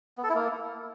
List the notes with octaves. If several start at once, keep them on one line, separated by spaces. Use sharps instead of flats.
B3
A4
E4
A#3